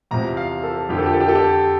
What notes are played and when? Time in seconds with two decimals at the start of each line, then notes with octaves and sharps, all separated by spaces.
0.11 E2 C3 F3 A#5
0.37 F5
0.63 A4
0.89 F2 D3 F3 G4
0.98 A4
1.06 G4
1.13 A4
1.20 G4
1.28 A4
1.35 G4